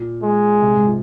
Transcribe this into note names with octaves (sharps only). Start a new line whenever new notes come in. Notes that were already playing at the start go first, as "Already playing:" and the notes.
Already playing: A#2
G#3
C3
G#2
F3